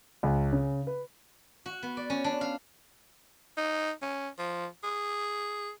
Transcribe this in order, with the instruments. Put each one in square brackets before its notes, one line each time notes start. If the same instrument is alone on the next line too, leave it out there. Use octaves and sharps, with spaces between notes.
[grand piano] C#2
C#3
B4
[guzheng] F#4
B3
D5
C#4
D4
F5
[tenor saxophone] D#4
C#4
F3
G#4